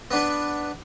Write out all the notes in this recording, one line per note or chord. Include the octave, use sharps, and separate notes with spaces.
B3 D4 B4